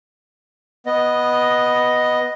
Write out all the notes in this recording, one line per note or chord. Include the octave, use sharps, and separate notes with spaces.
B3 D#5